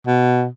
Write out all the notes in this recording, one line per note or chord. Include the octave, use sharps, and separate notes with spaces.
B2